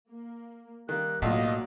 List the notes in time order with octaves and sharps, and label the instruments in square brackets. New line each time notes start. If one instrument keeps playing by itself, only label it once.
[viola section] A#3
[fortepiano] D#3 A#3 [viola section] G3 [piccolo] F#6
[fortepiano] B1 F4 [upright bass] A2 [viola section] F#3 A#3 D5 [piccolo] D#5